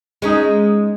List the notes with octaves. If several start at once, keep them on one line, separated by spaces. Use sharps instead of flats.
G#3 C#4 D#4